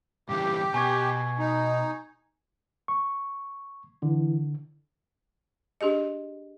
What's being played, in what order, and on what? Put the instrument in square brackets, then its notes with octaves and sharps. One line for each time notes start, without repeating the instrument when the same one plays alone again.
[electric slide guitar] G2 C#3 E3 [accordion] G4
[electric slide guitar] B2 [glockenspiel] G#5 C#6 G#6
[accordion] D#4
[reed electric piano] C#6
[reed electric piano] D3 [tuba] E3
[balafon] D4 G4 G#4 D#5